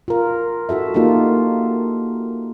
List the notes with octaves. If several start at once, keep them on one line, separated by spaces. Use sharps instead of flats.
F4 A#4
E4 F#4 A4 E5
A#3 D#4 F4 G4 A4